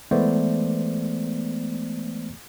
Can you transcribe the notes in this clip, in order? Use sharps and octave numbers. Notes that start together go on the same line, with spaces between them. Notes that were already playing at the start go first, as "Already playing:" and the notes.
E3 G#3 A3 B3 C5 D5